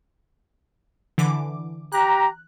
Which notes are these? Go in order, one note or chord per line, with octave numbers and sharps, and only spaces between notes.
D3 E3 D6
G4 A#5 F#6